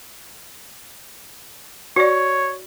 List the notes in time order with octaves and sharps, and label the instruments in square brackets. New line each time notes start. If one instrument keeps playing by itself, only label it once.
[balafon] F#4 D5 [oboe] C#5